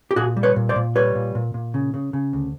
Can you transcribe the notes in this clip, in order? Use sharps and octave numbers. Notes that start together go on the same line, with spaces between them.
G4
A#2 F#4 G#4
G3
B4 C#5
A#2
C5 D5
A#2
G3 B4 C#5
A#2
A#2
A#2
C#3
C#3
C#3
D2